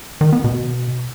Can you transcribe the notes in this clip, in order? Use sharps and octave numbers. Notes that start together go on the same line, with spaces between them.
D#3
B3
B2